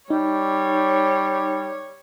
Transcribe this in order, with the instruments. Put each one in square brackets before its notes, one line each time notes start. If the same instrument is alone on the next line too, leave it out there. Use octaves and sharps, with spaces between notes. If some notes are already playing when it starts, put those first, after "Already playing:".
[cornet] G3 [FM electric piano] D#4 [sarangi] C#5